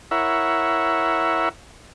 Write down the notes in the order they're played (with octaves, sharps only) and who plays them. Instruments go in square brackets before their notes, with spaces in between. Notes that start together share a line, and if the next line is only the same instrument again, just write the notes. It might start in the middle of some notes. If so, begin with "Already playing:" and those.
[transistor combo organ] E4 A#4 C#5 E5 F#5